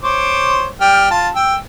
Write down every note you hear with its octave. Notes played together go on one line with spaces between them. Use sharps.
C5 C#5 D6
G3 G5 F6
F4 A5
G5 E6